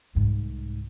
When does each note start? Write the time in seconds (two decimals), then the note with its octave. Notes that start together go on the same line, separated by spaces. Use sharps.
0.15 C2 G#2